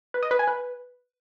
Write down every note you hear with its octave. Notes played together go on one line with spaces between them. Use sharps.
B4
D#5
B4
G#5
B4